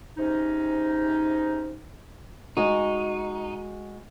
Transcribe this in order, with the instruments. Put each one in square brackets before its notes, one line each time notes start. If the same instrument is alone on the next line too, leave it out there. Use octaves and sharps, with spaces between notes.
[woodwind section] G#2 C3 C#4 D#4
[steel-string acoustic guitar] G#3 F#4 [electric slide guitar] D#4